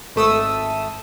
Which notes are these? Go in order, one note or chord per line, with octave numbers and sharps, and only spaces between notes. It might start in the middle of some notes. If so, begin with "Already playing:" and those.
G#1 A3 D#6 E6